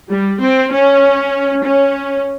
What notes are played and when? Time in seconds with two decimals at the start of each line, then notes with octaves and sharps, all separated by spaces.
0.11 G3
0.42 C4
0.72 C#4
1.64 C#4